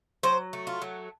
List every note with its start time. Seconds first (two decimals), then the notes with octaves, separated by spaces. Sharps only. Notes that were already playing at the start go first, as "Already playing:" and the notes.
0.23 F#3 C5
0.53 A3
0.67 F4
0.82 F#3